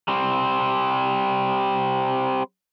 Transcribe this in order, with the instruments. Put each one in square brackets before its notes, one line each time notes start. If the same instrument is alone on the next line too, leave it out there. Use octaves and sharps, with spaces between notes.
[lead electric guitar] G3 C4